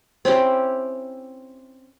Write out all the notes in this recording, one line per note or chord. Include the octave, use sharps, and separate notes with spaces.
C4 C#4 E4 G4